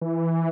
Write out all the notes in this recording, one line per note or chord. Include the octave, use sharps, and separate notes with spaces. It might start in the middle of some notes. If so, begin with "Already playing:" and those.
E3